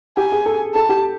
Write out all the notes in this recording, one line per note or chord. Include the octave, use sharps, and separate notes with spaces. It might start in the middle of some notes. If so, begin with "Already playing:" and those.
G4 G#5
G#4
A4
A4 A5
G4